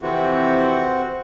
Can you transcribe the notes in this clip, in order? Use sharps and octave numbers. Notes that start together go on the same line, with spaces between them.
F2 C3 E3 C4 F#4